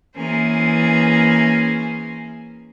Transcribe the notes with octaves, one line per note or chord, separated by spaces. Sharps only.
E3 A#3 C#4 G#4 C5